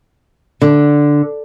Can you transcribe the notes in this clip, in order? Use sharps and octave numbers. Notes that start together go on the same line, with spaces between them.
D3